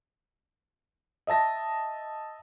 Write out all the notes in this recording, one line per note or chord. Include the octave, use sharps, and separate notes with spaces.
D#5 E5 A5 A#6